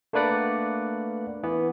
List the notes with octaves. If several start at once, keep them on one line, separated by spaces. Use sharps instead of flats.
A3 A#3 D4 B4 D5 F#5
E3 B3